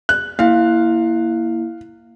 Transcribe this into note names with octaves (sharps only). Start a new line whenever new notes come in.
F#6
A#3 E4 F5